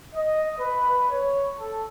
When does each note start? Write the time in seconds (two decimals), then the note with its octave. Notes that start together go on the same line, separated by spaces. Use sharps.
0.14 D#5
0.57 B4
1.10 C#5
1.58 A4